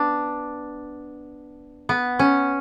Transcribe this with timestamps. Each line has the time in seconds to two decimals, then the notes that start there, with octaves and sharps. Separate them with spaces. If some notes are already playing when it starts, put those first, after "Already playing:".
Already playing: B3 D4
1.89 B3
2.19 C#4